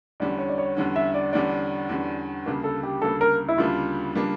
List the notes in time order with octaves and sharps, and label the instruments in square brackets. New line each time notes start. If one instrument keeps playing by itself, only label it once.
[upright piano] E2 D3 G3 C#4 [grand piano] D5
[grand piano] C#5
D5
C#5
[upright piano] E2 D3 G3 C#4
[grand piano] E5
D5
[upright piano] E2 D3 G3 C#4 [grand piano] D5
[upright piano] E2 D3 G3 C#4
D2 C#3 G3 A#3 D4
[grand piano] A4
G4
[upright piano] D2 C#3 G3 A#3 D4 [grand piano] A4
[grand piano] A#4
E4
[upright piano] D2 C#3 G3 A#3 D4 [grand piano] F4
[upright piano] C#3 G3 A#3 D4